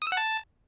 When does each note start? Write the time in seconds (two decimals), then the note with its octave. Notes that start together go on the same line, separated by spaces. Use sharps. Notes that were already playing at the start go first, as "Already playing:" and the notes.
0.02 D#6
0.07 E6
0.12 F#5
0.17 A5